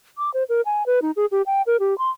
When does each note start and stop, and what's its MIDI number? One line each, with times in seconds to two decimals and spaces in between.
0.18 0.30 86
0.34 0.44 72
0.49 0.61 70
0.66 0.83 80
0.86 0.99 71
1.02 1.11 63
1.16 1.26 68
1.32 1.42 67
1.46 1.62 79
1.67 1.77 70
1.80 1.97 67
1.98 2.10 84